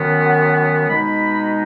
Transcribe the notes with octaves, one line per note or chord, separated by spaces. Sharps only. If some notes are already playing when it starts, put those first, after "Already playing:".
Already playing: F#2 D#3 B3
F#5
B2 G#3 D#4 B5